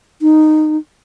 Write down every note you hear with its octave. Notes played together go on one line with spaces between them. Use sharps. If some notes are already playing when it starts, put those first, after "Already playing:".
D#4